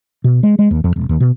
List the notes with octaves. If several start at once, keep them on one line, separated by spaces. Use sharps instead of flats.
B2
G#3
G#3
D#2
F2
E1
D#2
B2